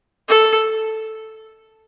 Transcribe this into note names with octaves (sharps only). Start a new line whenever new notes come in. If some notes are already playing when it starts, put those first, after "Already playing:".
A4